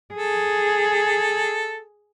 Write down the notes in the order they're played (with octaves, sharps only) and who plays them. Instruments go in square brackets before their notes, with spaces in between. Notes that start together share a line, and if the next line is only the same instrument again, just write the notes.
[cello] G#4 [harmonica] A4